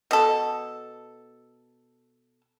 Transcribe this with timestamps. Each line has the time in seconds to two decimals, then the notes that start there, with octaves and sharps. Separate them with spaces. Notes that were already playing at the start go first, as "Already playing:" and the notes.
0.11 B2 A4